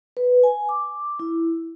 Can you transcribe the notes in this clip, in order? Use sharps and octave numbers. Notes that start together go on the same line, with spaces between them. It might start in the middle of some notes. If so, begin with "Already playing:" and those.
B4
G#5
D6
E4